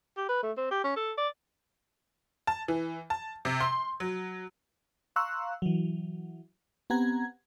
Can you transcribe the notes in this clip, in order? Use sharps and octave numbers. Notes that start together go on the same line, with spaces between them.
G4
B4
A3
C4
G4
C#4
A4
D5
A5
E3
A5
C3
C6
F#3
F5 A#5 C6 C#6 E6 F#6
E3 F#3
B3 C4 G4 F#5 A#5 G#6